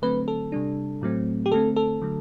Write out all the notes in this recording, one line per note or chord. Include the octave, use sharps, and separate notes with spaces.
D3 F#3 A3 C4 B4
A4
C3 G3 D4
A2 F#3 A3 C4
G4
D3 A3 C4 A4
A4
D3 F#3 A3